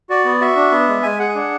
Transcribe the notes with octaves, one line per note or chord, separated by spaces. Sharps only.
F#4 D5
B3
F#4 E5
D4
B3
G#3
G#3 G#5
G#4 F#5
G#5
D4 F#5